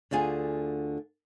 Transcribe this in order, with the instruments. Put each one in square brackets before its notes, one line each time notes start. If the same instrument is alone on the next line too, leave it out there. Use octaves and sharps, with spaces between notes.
[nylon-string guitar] D2 D3 F4 G#4 G#5